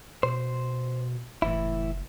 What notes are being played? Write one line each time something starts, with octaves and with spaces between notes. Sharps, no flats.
B2 C5
F#1 A2 E3 E4